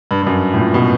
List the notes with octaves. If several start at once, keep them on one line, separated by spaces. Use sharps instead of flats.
G2
G2
F#2
A2
A#2
B2